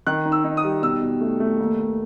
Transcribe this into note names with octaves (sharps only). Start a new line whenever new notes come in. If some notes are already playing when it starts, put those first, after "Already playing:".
D#3 F#6
D#4
E6
D#4
D#6
G3
B2 E6
B2
A3
A3
D#2
D#2